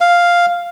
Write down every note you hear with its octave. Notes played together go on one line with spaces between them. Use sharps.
F5